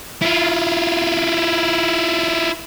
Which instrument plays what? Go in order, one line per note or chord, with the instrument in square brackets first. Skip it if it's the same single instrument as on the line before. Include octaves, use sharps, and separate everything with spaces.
[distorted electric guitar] E4 F4